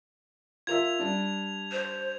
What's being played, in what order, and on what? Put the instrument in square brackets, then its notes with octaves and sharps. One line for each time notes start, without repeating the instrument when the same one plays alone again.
[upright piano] F4 A#4 E5 [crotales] G#6 F7
[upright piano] G3 D4
[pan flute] C5